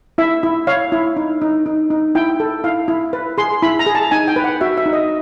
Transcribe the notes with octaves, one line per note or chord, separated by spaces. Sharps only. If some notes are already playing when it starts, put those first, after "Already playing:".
E4 E5
E4
C#5 F5
E4
D#4
D#4
D#4
D#4
E4 G5
A4
E4 F5
E4
B4
G#4 C6
E4 B5
A#5
G#4
A5
D#4 G#5
G5
B4
F#5
F#4 E5
E5
D#4
D#5